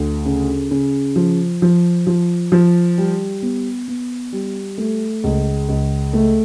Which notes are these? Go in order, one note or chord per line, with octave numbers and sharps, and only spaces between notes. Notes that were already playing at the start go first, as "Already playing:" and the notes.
Already playing: D2
C#3
C#3
F3
F3
F3
F3
G3
B3
B3
G3
A3
C#2
C#2
A3